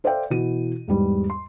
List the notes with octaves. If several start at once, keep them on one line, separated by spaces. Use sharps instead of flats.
A4 C5 D5 E5 F5 G5
B2 E3 E4 F#4 D#7
E2 G#2 G3
C6